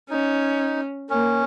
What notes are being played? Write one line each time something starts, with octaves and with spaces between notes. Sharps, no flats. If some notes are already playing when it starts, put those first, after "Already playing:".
C#4 D#4
A#3 C#4